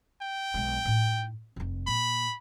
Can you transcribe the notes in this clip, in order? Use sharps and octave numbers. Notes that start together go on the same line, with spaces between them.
G5
B1 G#3
A2 D#4
F1 C3
A#2 B5